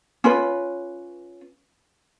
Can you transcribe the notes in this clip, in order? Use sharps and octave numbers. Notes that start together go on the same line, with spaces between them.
C#4 F4 B4